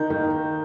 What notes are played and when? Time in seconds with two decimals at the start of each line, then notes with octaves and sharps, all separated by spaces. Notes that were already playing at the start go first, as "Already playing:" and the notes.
Already playing: D#3 A#3 D#4 G6
0.10 D#3 A#3 D#4